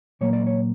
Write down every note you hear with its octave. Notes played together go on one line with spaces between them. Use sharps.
A#2 F#3 A#3 C#5
D5
C#5